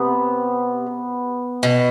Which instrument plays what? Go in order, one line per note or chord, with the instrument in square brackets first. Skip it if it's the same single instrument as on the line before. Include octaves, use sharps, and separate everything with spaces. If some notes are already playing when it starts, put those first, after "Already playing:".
Already playing: [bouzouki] C3 [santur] B3
[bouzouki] B2